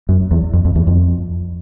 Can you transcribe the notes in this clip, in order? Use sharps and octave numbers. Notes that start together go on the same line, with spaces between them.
F#2
E2
F2
F2
E2
F2